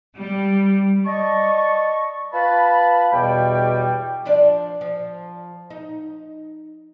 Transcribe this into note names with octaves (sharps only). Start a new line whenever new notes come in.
G3
D5 D#5 A5 C#6
F4 B4 A5 B5
E2 B2 G3 G5
F3 D4 D5
F3
D#4